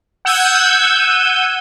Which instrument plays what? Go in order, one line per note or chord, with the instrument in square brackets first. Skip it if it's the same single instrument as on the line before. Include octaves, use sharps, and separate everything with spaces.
[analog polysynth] F#5 E6 G6 G#6 D#7